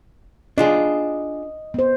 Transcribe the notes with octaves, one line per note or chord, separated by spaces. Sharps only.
D4 F4 G#4 D#5
B3 C5